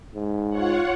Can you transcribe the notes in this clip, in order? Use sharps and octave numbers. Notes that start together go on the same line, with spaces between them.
G#2
F4 C#5 F#5